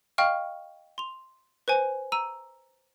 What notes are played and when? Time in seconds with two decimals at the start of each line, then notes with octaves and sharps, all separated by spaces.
0.18 D#5 F5 G5 C#6 F6
0.98 C6 F7
1.68 B4 C5 G#5
2.12 A#5 E6 D#7